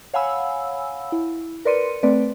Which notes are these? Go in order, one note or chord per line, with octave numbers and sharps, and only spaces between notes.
C#5 F5 F#5 G#5 B5 E6
E4
A#4 B4 D5 C6 C#7 D#7
A3 C4 B4 D5